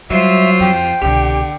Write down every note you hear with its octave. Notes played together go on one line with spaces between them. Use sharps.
F#3 G3 F4 C5 E5
F2 G5
C2 B2 D3 G4